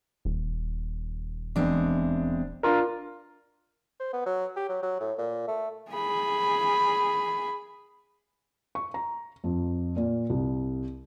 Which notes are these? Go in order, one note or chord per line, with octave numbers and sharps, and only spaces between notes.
D#1
E2 G#3 C4 D4
D4 F4 A#4
C5
B3
F#3
G4
F#3
F#3
A2
A#2
A3
G#4 B5
C#6
A#5
F2
A#2
C2